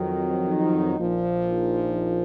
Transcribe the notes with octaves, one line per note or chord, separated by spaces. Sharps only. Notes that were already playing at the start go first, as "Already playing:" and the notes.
Already playing: F2 D#3 F#3
D#4
A#1 A#2 F3
D#4